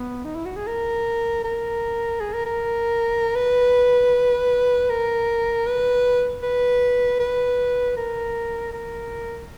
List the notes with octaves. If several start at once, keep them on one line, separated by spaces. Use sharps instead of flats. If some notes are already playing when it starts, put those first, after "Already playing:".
Already playing: B3
D#4
E4
F#4
G#4
A#4
A#4
G#4
A#4
A#4
B4
A#4
B4
B4
B4
A#4
A#4